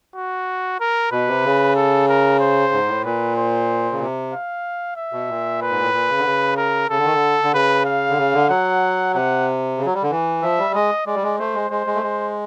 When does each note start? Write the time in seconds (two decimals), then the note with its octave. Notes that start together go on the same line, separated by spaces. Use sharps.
0.16 F#4
0.80 A#4
1.11 B2 B4
1.28 C3
1.45 C#3
1.76 A4
2.08 A#4
2.40 C5
2.73 G#2
2.88 A2
3.05 A#2 B4
3.37 C5
3.92 C#3
4.00 C3
4.33 F5
4.96 E5
5.13 B2
5.29 A#2
5.62 B4
5.69 G#2
5.81 A2
5.93 A#2
6.09 C#3
6.19 D3
6.25 C#3
6.57 A#4
6.89 C#3 A4
6.98 D3
7.05 D#3
7.14 D3
7.43 D3
7.53 C#3 B4
7.85 F5
8.10 D3
8.17 C#3
8.34 D3
8.49 F#3 F#5
9.14 C3 F#5
9.78 C#3
9.85 F#3
9.94 G3
10.03 D3
10.10 E3
10.42 F3 E5
10.59 G3
10.74 G#3 D#5
11.06 G#3 D5
11.15 G3
11.23 G#3
11.38 A3 C5
11.54 G#3
11.70 G#3 C5
11.86 G#3
11.95 A3
12.03 G#3